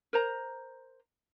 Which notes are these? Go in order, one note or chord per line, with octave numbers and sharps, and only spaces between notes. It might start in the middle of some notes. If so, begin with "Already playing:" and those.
A#4 C5 A#5